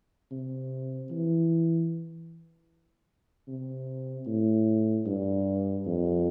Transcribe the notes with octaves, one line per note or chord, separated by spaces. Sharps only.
C3
E3
C3
A2
G2
F2